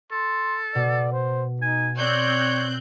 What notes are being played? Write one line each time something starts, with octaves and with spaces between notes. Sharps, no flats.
A4 C6
B2 D5
C5
D#4 G#5
C4 C#5 D5 F#6 G6